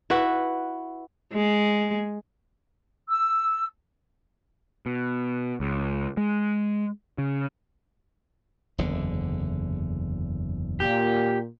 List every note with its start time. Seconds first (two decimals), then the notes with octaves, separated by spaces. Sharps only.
0.10 E4 F#4 B4
1.33 G#3
3.10 E6
4.86 B2
5.60 C#2
6.17 G#3
7.18 C#3
8.78 F#1 E2 D3
10.80 A#2 G4